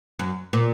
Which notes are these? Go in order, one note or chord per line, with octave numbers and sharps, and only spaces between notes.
F#2
A#2